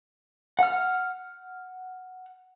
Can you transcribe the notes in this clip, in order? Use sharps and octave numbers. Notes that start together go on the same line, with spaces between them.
F#5 F6